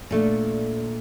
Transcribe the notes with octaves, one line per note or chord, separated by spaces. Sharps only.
A#2 A3 D4